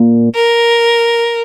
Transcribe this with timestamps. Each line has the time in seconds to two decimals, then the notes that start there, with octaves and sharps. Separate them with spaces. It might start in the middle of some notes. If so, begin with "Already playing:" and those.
Already playing: A#2
0.35 A#4